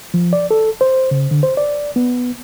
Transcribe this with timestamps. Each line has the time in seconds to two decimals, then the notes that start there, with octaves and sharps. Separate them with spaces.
0.14 F3
0.33 D5
0.51 A4
0.81 C5
1.11 C#3
1.31 D3
1.43 C5
1.57 D5
1.96 B3